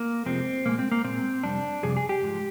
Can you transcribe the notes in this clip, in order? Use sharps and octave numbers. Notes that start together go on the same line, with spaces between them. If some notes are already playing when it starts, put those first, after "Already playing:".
Already playing: A#3
F2 C3 F3 G#3 C4
A#2 G#3 A#3
C4
A#3
A#2 G#3 C4
F2 C3 G3 D4
F2 C3 G3 G#4
G#4
G4
G#2 F3 G#3